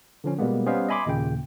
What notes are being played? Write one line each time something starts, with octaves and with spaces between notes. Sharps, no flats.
D3 F3 C#4
B2 G3 G#3 A#3 B3
G3 B3 C#4 C5 D#5 F5
D#5 E5 G#5 B5 C6 D6
D#2 A#2 C#3 G5